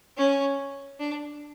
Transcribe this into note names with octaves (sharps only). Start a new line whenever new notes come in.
C#4
D4